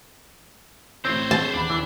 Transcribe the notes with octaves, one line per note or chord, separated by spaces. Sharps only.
A1 A2 C4 C5 C#5
G#4 A5
D#1 E2 D4 B5
E3